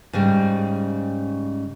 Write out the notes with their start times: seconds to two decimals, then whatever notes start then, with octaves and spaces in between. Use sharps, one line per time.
0.13 G#2 C#3 G3